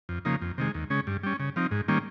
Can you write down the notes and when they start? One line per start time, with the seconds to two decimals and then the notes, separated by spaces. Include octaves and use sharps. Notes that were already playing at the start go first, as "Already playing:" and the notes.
0.09 F2
0.25 C#3 F3 A#3 D#4
0.42 F2
0.58 C3 D#3 G#3
0.75 D#2
0.90 C#3 G#3 C#4
1.07 G2
1.23 G3 C#4
1.40 C#3
1.56 F3 C4 D#4
1.71 G#2
1.88 D#3 G3 A#3 C#4